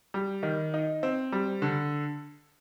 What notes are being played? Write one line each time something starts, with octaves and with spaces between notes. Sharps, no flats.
G3
D#3
D#4
C4
G3
D3